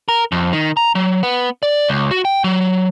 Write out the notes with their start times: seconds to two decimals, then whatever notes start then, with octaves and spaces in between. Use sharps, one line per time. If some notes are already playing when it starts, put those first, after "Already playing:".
0.09 A#4
0.32 F2
0.53 D#3
0.77 A#5
0.95 F#3
1.23 B3
1.63 D5
1.89 C#2
2.11 F#4
2.25 G5
2.44 F#3